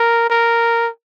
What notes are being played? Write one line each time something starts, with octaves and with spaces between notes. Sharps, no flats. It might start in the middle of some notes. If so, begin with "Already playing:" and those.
Already playing: A#4
A#4